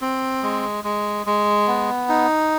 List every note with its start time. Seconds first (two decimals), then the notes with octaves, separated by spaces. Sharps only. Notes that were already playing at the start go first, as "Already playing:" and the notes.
0.01 C4
0.43 G#3
0.84 G#3
1.26 G#3
1.68 B3
2.09 D#4